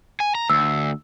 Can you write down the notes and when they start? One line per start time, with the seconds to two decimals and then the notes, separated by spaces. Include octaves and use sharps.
0.20 G#5
0.35 A#5
0.50 D2 E6